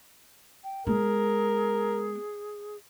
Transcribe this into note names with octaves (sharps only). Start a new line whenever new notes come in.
G5
G#3 B3 G#4 A#4